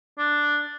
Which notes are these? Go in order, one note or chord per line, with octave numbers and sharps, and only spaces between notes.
D4